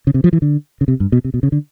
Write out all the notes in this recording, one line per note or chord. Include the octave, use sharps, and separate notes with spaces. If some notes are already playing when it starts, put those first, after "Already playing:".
C#3
C3
F3
E3
D3
C#3
C3
G2
B2
C3
B2
C#3
D3